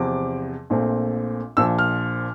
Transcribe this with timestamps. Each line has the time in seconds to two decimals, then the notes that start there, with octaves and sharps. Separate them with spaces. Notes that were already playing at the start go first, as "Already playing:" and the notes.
Already playing: E2 C3 F3 C4 D6
0.70 A#1 A#2 A3 C4
1.57 A#1 A#2 F3 E6
1.79 F6